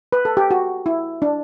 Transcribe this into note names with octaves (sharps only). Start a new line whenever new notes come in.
B4
A4
G4
F#4
E4
D4